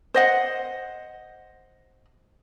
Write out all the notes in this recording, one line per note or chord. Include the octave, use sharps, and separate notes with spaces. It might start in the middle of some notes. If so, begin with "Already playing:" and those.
C5 D#5 F#5